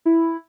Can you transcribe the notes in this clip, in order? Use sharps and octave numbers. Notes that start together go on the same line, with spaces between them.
E4